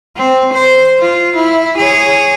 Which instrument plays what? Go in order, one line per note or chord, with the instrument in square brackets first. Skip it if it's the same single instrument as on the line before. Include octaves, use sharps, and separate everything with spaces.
[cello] C4
C5
F4
E4
G#4 C#5